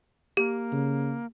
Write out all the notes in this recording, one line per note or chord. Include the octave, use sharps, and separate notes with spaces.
A#3 G4
C#3